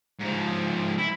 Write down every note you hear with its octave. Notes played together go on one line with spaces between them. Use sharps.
G#2 F3
E4